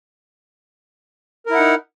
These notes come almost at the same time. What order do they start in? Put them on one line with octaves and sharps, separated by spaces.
A#4 E4 F#5 D#4